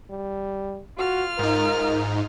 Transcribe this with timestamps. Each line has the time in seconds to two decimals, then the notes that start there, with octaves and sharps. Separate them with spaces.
0.11 G3
0.98 F4 F#4 F6
1.39 G#2 D#4 A#4